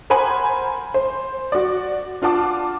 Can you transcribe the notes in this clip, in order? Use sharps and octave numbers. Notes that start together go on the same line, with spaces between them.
A#4 C5 F#5 G#5 B5
C5
F#4 D5
D4 F4 F#5 A5 D6